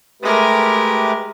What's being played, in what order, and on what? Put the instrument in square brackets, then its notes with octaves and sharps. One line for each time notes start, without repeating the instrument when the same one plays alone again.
[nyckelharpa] G#3 A#4 [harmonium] A3 G4 B4